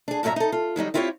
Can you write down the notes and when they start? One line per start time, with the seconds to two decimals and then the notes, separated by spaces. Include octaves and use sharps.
0.08 D4 G#4
0.23 G2 A#2 F#3 A#4 E5 A#5
0.36 D#4 A4
0.52 F4
0.76 D#3 F#3 G3 D#4
0.94 C4 E4 F4 G4 C5 C#5